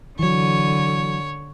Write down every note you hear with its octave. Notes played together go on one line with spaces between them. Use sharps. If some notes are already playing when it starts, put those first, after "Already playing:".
D3 E3 F#3 C#5